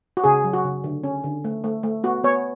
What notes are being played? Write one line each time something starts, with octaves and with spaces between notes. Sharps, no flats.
F#4
C#3 G#4
F#3
F#4
C#3
D3
C#4
D3
A3
A3
A3
B3 F#4
B3 C#5